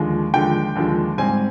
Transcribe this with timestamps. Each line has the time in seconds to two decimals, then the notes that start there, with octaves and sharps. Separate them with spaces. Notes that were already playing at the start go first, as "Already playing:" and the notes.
Already playing: D#2 D3 F3 G#3
0.34 D#2 D3 F3 G#3 G5
0.76 D#2 D3 F3 G#3
1.18 G#2 G3 C4 G#5